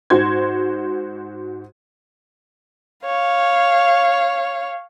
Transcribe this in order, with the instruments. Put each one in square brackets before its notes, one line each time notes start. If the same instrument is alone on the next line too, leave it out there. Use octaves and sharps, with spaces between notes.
[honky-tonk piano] G#2 F#4 C5 G#6
[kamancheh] C#5 F5